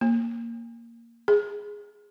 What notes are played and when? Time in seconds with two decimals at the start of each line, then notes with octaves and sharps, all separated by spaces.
0.01 A#3
1.28 G#4